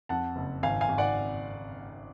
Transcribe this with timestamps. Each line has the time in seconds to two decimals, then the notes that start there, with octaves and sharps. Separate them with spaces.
0.09 F2 F#5 A5
0.36 F#1
0.63 G#1 F5 G#5
0.81 F5 G#5
0.89 G#1
0.98 D5 F#5